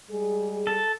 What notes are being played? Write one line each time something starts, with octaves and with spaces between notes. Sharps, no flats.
G3 G#3 G#4
A4